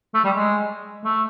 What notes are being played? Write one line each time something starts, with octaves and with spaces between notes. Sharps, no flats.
A3
G3
G#3
A3